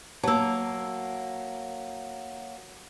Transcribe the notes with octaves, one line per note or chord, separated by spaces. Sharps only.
F#3 A#3 A5 E6